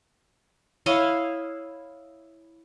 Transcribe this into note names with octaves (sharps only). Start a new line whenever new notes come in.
E4 C#5 D#5 F5